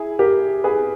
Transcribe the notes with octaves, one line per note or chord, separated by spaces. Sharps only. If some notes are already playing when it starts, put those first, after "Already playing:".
Already playing: E4 G#4
G4 A#4
G#4 B4